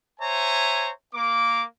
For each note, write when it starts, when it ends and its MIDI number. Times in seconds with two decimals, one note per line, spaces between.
0.20 0.90 72
0.20 0.90 73
0.20 0.90 76
0.20 0.90 80
0.20 0.90 82
1.14 1.64 58
1.14 1.64 86